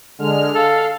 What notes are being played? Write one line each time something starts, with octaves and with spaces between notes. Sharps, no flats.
D3 G#3 F6
A4 F5